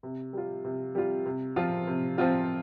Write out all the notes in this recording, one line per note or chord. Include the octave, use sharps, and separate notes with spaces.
C3
G3 F4
C3
G3 F4
C3
F3 C4 F4
C3
F3 C4 F4